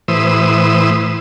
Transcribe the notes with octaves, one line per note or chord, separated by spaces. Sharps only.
A2 E3 B4 C5 D#6 E6